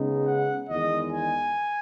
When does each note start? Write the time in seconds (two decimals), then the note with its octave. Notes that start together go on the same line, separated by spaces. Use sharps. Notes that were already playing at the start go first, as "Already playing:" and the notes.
Already playing: C#3 G#3 B3 D#4
0.25 F#5
0.69 E2 D#3 G#3 D#5
1.12 G#5